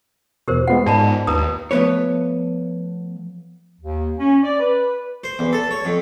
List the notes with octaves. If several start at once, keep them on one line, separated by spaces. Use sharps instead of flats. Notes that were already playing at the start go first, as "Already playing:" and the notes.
E2 B2 G4 A#4 C5
G#3 B3 F4 F#5
G#2 D5 A5 B5
D#2 B4 A#5 D#6
F3 A3 B3 B4 C#5
D#2
C#4
D5
B4
C5
E2
A4
C#5
F2